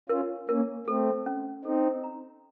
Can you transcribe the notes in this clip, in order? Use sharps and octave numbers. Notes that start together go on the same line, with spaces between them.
C#4 F4 A#4
A#3 C#4 A#4
A3 C4 A4
C#4
C4 D#4 A4
A#5